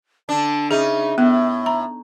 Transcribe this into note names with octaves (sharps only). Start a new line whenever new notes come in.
D3 D4 A5
C#3 D#4 G#4 E5
A2 B3
A#5